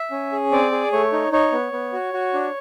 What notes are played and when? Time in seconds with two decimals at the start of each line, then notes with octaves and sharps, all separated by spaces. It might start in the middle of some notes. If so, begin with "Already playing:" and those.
Already playing: E5
0.11 C#4
0.32 G#4
0.52 C4 D5
0.72 G#4
0.92 A3 C#5
1.13 D#4
1.32 D#4 C#5
1.52 B3
1.72 B3
1.93 F#4
2.13 F#4
2.34 D4